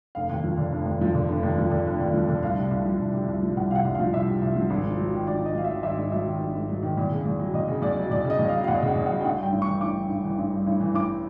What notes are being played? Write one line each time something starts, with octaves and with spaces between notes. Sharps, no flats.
F1 F5
D#2
F3
D3
F1
D#2
F3
D3
F1
D#2
F3
D3
F1
D#2
F3
D3
C2 F5
C3
C2 F5
F3
C2
C3
C2
F3
C2 F#5
C3 F5
F#5
C2
F5
F3
C2 E5
C3
C2
F3
G#1
G#2
F#3
D#3
G#1 D5
G#2 D#5
F#3 F5
E5
D#3
G#1 E5
G#2
F#3 E5
D#3
G#1
G#2
F#3
D#3
E2
C#3
E2
F#3
E2 D#5
C#3
E2 D5
F#3
E2 D5
C#3
D#5
E2
F5
F#3
F5
E2 F#5
C#3 F#5
E2
F#5
F#3
G5
A1 F#5
G2 G5
A1
C#6
E3
A1 D6
G2
A1
E3
A1
G2
A1
E3
A1 D6